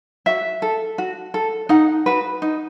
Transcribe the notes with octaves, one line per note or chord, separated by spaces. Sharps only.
F#4 E5
A4
F#4
A4
D#4 F#5
F#4 B4
D#4